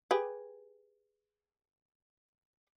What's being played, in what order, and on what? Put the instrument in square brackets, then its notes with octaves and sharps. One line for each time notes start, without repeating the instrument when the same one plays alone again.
[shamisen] G4 G#4 B4